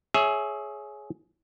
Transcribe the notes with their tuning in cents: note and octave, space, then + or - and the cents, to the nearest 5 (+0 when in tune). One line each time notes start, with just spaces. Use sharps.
G#4 +15 C#5 +0 E5 +0